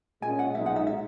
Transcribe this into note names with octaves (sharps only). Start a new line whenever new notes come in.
A#2 G#3 C#4 G#5
F#5
B1 A#2 G#3 D#4 E5
F#5
E5
E5